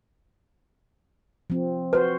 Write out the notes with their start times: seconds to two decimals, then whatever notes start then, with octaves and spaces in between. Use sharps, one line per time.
1.50 F3 C4
1.93 F#4 B4 C5